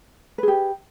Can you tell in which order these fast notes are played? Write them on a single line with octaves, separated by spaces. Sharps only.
B4 G#4 G4